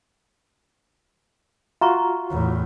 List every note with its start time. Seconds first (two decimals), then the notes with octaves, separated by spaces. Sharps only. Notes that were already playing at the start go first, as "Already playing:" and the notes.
1.81 F4 F#4 E5 A#5 C#6
2.31 E2 A2